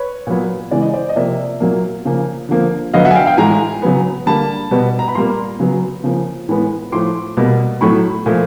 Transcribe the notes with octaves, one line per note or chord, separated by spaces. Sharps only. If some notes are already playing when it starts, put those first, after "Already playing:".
Already playing: B4 C#5
A#2 F#3 B3
C#3 E3 G#3 D5
D#5
C5 D5
D#5
C3 F3 A#3 D5 E5
A#2 F#3 A#3
C#3 F3 A#3
D3 F3 A#3
D3 F#3 B3 D#5 F5
E5 F#5
G#5
F5 G5
F5 G5
A2 E3 G#3 G#5 A#5
C#3 F#3 B3
D3 G3 A#3 A5 B5
B2 G3 B3
A#5
B5
A#2 G3 A#3 A#5 C6
C#3 F#3 B3
C#3 F3 A#3
A2 E3 G#3 B3
A2 F3 A3 C6 D6
B2 G3 A#3
A2 F#3 A3 B5 C#6
A#2 F3 A3